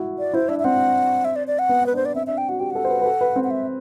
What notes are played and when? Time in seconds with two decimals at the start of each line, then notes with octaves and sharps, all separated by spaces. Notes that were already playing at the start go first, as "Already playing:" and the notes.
Already playing: E4 F#4
0.19 D5
0.33 E4 C5
0.49 D4 E5
0.59 E5
0.64 C4 F#5
1.25 E5
1.36 D5
1.47 D5
1.59 F#5
1.69 B3
1.86 B4
1.93 D4 C5
2.05 D5
2.14 C4 E5
2.27 D4 E5
2.37 G5
2.49 F#4 F#5
2.59 G4 G5
2.70 A4 F#5
2.84 C5
2.90 B4
3.01 B4
3.05 A4
3.21 B4
3.36 C4
3.44 F#5
3.50 E5